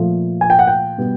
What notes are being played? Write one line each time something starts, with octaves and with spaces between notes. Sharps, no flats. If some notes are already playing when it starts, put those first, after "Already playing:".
Already playing: A#2 F3 A3
G#5
G5
F#5
G5
B2 G3 B3